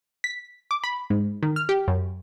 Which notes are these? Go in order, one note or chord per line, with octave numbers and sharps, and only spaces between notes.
B6
D6
B5
G#2
D#3
F6
G4
F#2